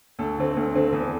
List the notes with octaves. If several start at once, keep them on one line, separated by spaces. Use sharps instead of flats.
D2 A4
D3 A3 C4
D2
D3 A3 C4
E2 A4